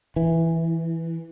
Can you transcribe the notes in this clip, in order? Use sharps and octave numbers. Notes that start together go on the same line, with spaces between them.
E3